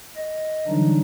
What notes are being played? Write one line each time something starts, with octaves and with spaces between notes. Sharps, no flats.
D#5
D3 E3 F#3 G3 D4 D#4